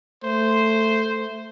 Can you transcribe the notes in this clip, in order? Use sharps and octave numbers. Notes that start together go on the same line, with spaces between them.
A3 C5